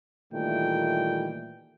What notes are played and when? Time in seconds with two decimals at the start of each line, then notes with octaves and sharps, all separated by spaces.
0.33 A#2 D#3 E3 G3 A3 G5